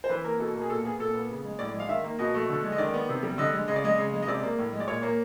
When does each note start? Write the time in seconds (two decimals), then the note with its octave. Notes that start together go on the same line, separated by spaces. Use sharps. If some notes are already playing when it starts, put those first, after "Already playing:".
0.04 C5
0.09 E3 B4
0.24 A#3 A#4
0.39 B2 A4
0.55 A#3
0.61 G#4
0.70 A#2 A4
0.85 B3 G#4
0.99 A#2 A4
1.14 B3
1.30 C#3
1.45 G#3
1.59 A2 D5
1.74 G#3
1.80 F5
1.89 D#3 E5
2.05 A#3
2.19 B2 D#5
2.34 A3
2.49 D3
2.64 G#3
2.72 D#5
2.78 D#3 D5
2.94 B3
3.09 C3
3.23 G3
3.38 D3 D#5
3.54 G#3
3.68 C#3 D#5
3.76 D5
3.84 G#3 D#5
3.98 C#3
4.13 G#3
4.22 D#5
4.27 C3 D5
4.43 A#3
4.58 A2
4.73 G#3
4.80 D5
4.88 A#2 C#5
5.03 A#3